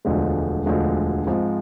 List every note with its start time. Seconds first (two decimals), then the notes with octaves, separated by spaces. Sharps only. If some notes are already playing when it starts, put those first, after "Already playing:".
0.05 E1 D2 D3 F3 G#3
0.66 E1 D2 D3 F3 G#3
1.27 G#2 F3 G#3 C4